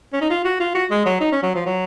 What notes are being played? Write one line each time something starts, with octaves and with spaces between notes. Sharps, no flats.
C#4
D#4
F4
F#4
F4
F#4
G#3
F#3
D#4
C#4
F#3
F3
F#3